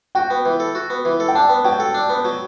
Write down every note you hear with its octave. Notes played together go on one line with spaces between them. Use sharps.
F#4 G5
B3
E3
A4
F#4
B3
E3
A4
G5
D4 A5
B3
F#3 G5
A4
D4
B3
F#3